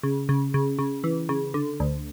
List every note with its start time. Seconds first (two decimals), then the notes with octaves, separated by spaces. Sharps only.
0.03 C#3
0.29 C#3
0.54 C#3
0.79 C#3
1.04 E3
1.29 C#3
1.54 D3
1.80 D2